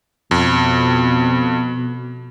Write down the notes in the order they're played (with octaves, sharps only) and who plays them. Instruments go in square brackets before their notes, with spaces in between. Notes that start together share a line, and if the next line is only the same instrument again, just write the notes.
[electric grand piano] F2 [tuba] B2